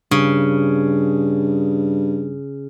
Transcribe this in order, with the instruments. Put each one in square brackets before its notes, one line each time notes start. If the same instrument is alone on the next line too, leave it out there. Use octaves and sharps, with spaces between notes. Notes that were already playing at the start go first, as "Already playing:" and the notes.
[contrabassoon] G2 [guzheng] C#3